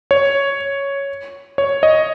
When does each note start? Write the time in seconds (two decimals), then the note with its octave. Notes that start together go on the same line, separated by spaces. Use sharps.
0.11 C#5
1.58 C#5
1.83 D#5